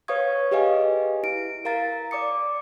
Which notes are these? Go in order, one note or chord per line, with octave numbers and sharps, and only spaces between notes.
B4 C#5 F5 C#6 D#6 G#6
G4 G#4 B4 D#5 F5 G#5
E4 D7
A#4 F5 A#5 A6
D5 D6 D#6 C#7